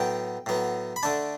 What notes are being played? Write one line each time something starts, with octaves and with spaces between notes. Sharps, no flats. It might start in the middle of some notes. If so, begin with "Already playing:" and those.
Already playing: A2 F#3 B3 G5
A2 F#3 B3
B5
D3 A3 D4 A5